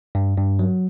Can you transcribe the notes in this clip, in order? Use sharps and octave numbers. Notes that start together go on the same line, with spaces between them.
G2
G2
F#3